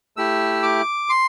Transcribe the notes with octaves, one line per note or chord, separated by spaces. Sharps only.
A3 E4 G4 E6
D6
C6